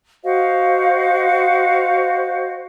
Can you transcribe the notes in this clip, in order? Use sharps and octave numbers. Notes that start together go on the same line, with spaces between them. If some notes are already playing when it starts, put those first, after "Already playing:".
F#4 C5 D#5 F5